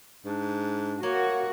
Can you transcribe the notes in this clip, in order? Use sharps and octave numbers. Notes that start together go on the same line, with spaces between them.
G#2 D4
A#3 F#4 C#5